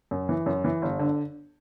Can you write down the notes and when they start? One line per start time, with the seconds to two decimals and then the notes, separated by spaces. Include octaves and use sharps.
0.11 F#2
0.29 E3
0.46 F#2
0.64 E3
0.82 G1
0.99 D3